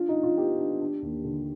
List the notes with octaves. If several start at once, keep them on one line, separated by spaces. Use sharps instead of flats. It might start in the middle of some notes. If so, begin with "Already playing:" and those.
Already playing: D4 F4
D#4
D4
F4
B3 G4
D4
D4
D#2
D3